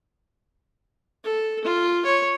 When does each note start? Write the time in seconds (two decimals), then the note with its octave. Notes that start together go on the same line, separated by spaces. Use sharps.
1.24 A4
1.64 F4
2.05 C#5